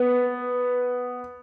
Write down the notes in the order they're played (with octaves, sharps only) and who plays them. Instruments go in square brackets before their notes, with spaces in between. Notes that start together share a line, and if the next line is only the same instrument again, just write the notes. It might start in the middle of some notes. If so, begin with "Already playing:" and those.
Already playing: [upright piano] B3